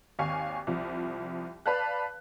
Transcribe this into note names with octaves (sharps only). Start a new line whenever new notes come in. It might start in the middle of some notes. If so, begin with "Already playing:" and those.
G#1 D#2 F5 G#5 C#6
C2 F3
B4 D5 F5 A5 F#6